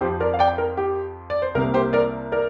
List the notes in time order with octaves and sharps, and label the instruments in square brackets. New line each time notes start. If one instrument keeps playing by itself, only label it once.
[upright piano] F2 F3 C4 G4 C5
A#4 D5
F5
D5 G5
A#4
G4
D5
C5
C2 C3 A#3 A#4
G4 C5
A#4 D5
A#4 D5